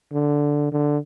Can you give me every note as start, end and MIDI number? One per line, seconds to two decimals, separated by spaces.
0.13 0.69 50
0.72 0.98 50